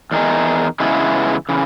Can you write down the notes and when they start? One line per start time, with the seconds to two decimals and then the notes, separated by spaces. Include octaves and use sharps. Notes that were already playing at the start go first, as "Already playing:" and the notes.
0.11 E2 D#3 A#3 D#4 G#4
0.80 C#3 E3 G#3 B3 E4
1.49 C#3 E3